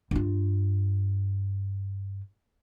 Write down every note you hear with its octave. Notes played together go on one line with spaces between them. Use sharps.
G2 F4